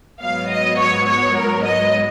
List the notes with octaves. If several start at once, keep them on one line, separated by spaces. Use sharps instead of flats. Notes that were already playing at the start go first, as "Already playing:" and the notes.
G#2 F#3 B3 F5
D#5
C#5
C#5
A#4
D#5